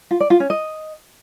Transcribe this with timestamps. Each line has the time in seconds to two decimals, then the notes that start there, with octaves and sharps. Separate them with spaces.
0.11 F4
0.20 D5
0.30 F4
0.40 C#4
0.50 D#5